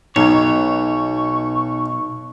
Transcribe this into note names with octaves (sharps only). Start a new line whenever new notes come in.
B1 B2 D#4 C#5 C#6